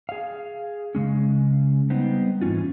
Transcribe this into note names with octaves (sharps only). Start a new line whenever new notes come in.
G#4 F5
C#3 G#3 C#4
G3 B3 C4 D#4
G#2 E3 G#3 C#4 F4